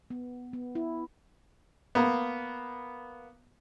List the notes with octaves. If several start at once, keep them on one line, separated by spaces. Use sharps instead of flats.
B3
B3
E4
A#3 B3